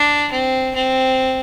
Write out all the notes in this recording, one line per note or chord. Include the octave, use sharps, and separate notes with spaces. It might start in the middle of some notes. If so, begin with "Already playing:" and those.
Already playing: D4
C4
C4